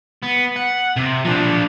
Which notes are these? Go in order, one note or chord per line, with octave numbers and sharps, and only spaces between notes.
B3
F#5
C3
F3 D4